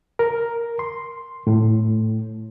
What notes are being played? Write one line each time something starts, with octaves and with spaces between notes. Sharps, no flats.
A#4
C6
A2